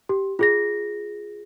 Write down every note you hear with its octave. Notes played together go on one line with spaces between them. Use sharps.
G4
F4 G#4 A#6